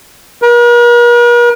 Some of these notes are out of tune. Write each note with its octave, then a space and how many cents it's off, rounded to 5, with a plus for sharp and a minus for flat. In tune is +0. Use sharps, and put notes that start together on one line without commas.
A#4 +45